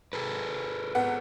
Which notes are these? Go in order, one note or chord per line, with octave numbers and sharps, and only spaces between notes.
G#4 A4 B4
G#1 B3 F#5